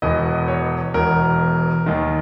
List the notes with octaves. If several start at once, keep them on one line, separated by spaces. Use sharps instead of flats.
E1 E2 B2 D#5
C#5
E1 E2 B2 A#4
D#2 D#3